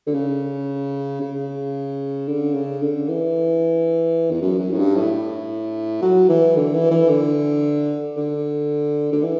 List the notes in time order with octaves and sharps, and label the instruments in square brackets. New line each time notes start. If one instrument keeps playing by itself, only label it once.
[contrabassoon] D3
C#3
C#3
D3
C#3
D3
E3
E2
F#2
F#2
A2
G2
A2
F#3
E3
D3
E3
E3
D3
D3
D3
E3